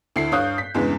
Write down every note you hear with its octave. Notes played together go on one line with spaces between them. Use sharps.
D2 E4 C7
G2 C#5 F5 D#6 F#6 G6
B6
E2 G2 C#3 E3 G#3